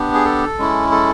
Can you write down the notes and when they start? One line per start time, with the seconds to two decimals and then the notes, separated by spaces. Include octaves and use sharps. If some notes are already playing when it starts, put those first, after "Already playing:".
Already playing: B3 D4 G4
0.14 G#4
0.25 A4
0.58 G#3 C#4 E4
0.92 A4